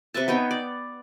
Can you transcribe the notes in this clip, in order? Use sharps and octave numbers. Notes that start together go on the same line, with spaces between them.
C3 B4 E5 A5
B3 D#4 C#5 G5
D5